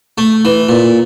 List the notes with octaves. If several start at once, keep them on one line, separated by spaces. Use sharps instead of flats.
A3
E3
A#2